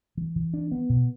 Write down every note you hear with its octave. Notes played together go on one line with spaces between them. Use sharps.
E3
E3
D4
B3
B2